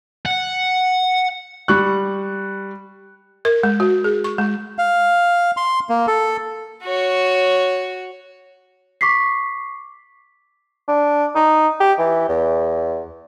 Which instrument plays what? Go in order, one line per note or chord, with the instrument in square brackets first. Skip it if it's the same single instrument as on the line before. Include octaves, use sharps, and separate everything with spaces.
[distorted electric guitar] F#5
[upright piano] G3 C#6 F#6
[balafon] A#4
G#3
F#4
G#4
C#6
G#3
[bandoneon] F5
C6
A#3
A4
[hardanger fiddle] F#4 C#5
[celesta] C#6 D6 B6 C7
[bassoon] D4
D#4
G4
E3
E2